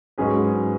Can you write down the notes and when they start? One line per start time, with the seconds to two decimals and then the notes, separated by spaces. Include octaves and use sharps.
0.18 G#2 F#3 C#4 G#4 B4